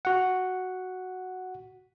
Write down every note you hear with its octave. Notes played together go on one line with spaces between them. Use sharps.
F#4 F#5